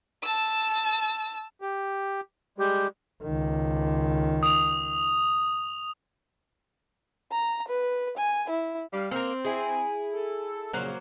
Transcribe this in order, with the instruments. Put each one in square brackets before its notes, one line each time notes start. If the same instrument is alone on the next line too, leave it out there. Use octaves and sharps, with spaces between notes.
[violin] A5 E6
[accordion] G4
[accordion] G3 G#3 [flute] G4
[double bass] C#2 D#3
[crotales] D#6 F7
[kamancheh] A#5
B4
G#5
E4
[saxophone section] G3 F5
[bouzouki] A#3 A#4 [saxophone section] C4
[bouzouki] E4 G#4
[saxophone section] A4
[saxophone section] F2 A#2 C#3 [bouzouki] F#3 A#3 C5